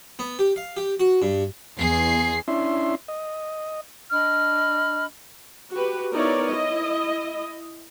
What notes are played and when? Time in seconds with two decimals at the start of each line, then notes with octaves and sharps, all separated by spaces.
0.19 B3
0.39 G4
0.56 F5
0.77 G4
1.00 F#4
1.22 G2
1.78 E2 G#4 C7
2.48 C#4 D4 E4 E5 C6
3.08 D#5
4.12 D4 D#5 B5 F6
5.72 F#4 G4 B4
6.13 B3 D#4 E4 A#4 C#5 D5
6.46 E4 D#5